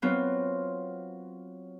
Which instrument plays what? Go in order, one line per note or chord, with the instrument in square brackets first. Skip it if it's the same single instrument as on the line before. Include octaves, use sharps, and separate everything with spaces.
[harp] F#3 B3 C4 F4